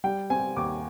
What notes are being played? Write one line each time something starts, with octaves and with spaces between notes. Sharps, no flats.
G3 G5
C4 G#5
D#2 D6